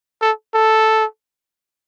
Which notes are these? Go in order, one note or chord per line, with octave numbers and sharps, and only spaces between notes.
A4
A4